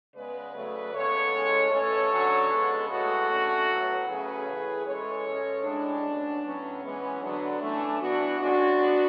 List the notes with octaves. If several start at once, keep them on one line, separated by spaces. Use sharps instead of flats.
C#3 G#3 B3 B4 D5
C#3 F#3 A3
C#3 G#3 B3 A4 C#5
A2 G#3 C#4
B2 A3 C#4 A4 C#5
D3 F#3 C#4
C#3 G#3 B3
A2 G#3 B3 F#4 A4
D3 A3 C#4
A2 F#3 B3
C#3 F#3 A3 C#4 G#4 B4
A2 E3 A3
E3 G#3 C#4 A4 C#5
B2 G#3 C#4
A2 G#3 C#4 D4
B2 A3 C#4
A2 F#3 B3 C#4
E3 G#3 B3
D3 F#3 B3 D4
E3 A3 C#4
E3 B3 D4 F#4
A2 G#3 C#4 D4 F#4
B3